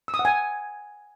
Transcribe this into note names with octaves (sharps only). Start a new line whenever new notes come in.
E6
D#6
F#5
G#5